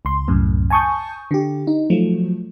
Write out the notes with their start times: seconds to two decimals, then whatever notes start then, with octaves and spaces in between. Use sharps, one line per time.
0.05 C#2 C6
0.28 C2 F#2 A2
0.70 G#5 A5 C#6 D#6 G6
1.31 D3 G4
1.67 D#4
1.90 F3 F#3 A3